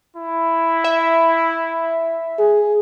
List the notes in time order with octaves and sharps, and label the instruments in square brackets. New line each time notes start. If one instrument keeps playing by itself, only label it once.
[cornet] E4
[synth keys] E5
[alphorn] G#4